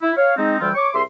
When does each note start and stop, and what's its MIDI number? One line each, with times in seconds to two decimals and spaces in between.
0.02 0.11 64
0.17 0.34 73
0.17 0.34 77
0.37 0.56 56
0.37 0.56 60
0.37 0.56 63
0.60 0.71 38
0.60 0.71 52
0.60 0.71 55
0.60 0.71 65
0.60 0.71 79
0.60 0.71 88
0.75 0.90 73
0.75 0.90 85
0.75 0.90 86
0.94 1.02 36
0.94 1.02 68
0.94 1.02 76
0.94 1.02 84